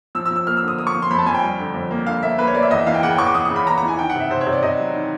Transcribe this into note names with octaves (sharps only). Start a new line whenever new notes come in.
F3 E6
E6
F3
E6
A#3 F6
E6
D3
D#6
A#3 D#6
C#6
F3
C6
F2 B5
A5
F2 G#5
G5
G3
D3
F2
A#3
D3 F5
A#3 E5
A#3 B4
C#5
A#3 D5
E5
E2 D#5
E5
E3 F5
G5
C#3 F#5
G5
E2 C#6
D6
E2 D#6
D#6
C#3
B5
E2 A#5
E3 A#5
G#5
D#3 G5
F#5
C3
E5
C3 C5
C#5
C3
D5
C3 D#5
F#3
D#3